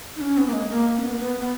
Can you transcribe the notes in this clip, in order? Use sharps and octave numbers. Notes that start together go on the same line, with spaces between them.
D#4
C#4
B3
A#3
G#3
A#3
C#4
B3
A#3
B3
B3